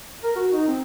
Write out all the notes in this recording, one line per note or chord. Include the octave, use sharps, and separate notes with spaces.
A#4
F#4
D#4
C4